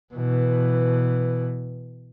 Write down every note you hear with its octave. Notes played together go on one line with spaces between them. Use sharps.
B2 E3